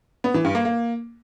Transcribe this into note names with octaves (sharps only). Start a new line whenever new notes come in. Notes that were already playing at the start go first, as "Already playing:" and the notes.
B3
E3
G2
A#3
A#3